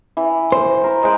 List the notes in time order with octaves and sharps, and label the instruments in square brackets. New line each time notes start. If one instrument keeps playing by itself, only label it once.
[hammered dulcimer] E3
[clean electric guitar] C5
[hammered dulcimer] A#4
G#3 G5